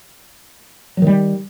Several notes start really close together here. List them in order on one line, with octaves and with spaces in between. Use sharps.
F#3 D#3 G3